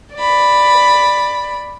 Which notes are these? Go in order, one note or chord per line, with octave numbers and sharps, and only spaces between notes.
D5 B5